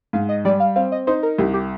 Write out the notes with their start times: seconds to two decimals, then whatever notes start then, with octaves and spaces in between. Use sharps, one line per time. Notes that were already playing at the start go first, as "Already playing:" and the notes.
0.13 G#2 F5
0.29 D#5
0.45 G3 D5
0.60 F5
0.76 C4 F5
0.92 D#5
1.07 D#4 C5
1.23 A#4
1.38 C2 G4
1.54 G4